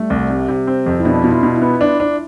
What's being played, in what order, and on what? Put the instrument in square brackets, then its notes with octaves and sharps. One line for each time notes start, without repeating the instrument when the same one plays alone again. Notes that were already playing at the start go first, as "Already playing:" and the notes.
Already playing: [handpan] G3 [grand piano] A3
[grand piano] C2
C3
C3
C4
F2
[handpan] E4
[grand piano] B2 [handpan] D4
[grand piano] B2 [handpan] F4
[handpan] E4
[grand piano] B2
[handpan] E4
[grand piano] B3
D4
D4